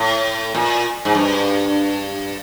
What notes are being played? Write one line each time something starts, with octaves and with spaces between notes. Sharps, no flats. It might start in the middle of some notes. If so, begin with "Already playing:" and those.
Already playing: A2
A#2
G#2
G2